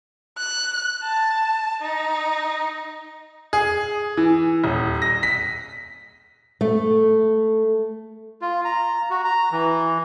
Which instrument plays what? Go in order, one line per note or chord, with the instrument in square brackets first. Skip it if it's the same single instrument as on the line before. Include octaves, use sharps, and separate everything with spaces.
[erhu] F#6
A5
D#4
[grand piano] G#4
E3
D#1
A#6
B6
[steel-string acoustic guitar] A3
[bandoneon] F4
A#5
F#4
A#5
E3